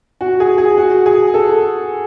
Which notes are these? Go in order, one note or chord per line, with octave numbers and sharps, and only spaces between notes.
F#4
G#4
G#4
F#4
G#4
A4